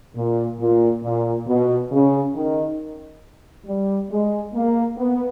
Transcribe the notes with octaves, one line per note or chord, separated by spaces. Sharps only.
A#2
A#2
A#2
B2
C#3
D#3
G3
G#3
A#3
B3